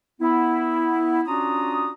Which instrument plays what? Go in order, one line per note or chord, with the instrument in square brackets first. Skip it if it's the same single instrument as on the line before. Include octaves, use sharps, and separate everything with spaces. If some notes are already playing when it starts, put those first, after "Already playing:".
[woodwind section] B3 E4
C#4 D4 F4 F#4 A#5 D#6